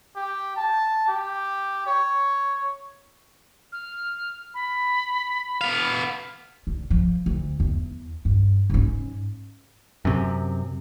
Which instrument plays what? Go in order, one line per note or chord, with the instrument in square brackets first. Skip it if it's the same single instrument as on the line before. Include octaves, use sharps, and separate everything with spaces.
[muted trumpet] G4
A5
G4
C#5
[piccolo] F6
B5
[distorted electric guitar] B3 F5
[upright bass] D3
F3
D2
E2
G2
G#2 C#4
[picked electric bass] F#2 C3